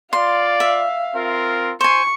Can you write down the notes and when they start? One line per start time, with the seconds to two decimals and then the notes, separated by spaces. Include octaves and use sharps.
0.13 F4 D5 F5 C6
0.60 E5
1.14 C4 F4 A#4
1.81 C5 G#5 C#6